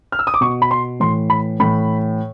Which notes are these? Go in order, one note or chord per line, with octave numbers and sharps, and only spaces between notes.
F6
E6
D#6
D6
B2 C#6
B5
C6
A2 E3 C6
B5
A2 E3 B5